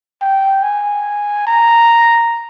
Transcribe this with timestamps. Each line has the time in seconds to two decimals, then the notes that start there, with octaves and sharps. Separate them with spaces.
0.21 G5
0.63 G#5
1.47 A#5